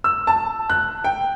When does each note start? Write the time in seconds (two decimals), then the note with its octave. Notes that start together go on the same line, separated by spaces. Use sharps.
0.04 E6
0.27 A5
0.70 F#6
1.04 G5